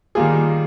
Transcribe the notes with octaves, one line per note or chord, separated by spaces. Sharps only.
D#3 G3 A#3 F4 G#4